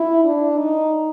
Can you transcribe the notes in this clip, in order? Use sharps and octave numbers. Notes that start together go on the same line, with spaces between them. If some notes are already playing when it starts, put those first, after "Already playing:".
Already playing: E4
D4
D#4